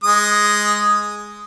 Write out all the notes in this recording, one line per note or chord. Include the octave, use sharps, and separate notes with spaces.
G#3 D#6